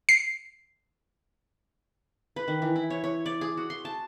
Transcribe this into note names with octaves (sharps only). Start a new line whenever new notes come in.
C7
B4
D#3
E3
E4
C#5
C#5
D5
G#4
F#4
C6
A5